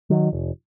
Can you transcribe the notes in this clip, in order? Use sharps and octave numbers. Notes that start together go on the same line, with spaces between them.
D#3 F#3
F1